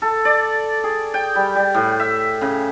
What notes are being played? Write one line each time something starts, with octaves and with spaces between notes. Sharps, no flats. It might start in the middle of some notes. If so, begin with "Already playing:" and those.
A4
D5
G#4
G5
G3
G3
A2
E5
C#3